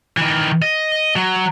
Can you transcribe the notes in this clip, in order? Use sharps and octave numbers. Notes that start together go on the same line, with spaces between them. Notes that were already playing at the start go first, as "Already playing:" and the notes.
D#3 E3
D#5
F#3